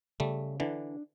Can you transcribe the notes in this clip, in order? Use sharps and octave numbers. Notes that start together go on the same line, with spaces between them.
C#3 G3 A3
D3 E3 D4